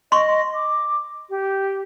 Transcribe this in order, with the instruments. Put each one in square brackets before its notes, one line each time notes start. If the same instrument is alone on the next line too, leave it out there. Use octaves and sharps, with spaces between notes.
[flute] D#5 [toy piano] C6 C#6
[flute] D6
G4